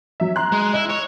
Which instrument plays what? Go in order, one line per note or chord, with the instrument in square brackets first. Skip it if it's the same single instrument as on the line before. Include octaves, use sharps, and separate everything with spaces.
[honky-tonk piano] F#3 E5
A#5 C6 F#6
[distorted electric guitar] G#3
[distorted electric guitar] E4 [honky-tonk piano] D#5
[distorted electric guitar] C#5